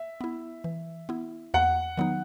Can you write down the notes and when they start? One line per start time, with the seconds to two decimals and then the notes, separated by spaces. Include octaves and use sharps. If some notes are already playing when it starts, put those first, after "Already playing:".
Already playing: E5
0.21 B3 E4
0.64 E3
1.09 B3 E4
1.54 E2 F#5
1.97 D#3 F#3 B3 D#4